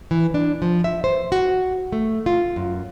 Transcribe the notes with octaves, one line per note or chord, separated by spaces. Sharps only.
E3
D4
F3
E5
C5
F#4
A3
F4
F#2